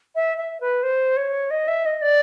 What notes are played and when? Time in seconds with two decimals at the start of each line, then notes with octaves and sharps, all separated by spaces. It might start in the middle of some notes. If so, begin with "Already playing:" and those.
0.15 E5
0.37 E5
0.61 B4
0.83 C5
1.17 C#5
1.50 D#5
1.68 E5
1.86 D#5
2.02 D5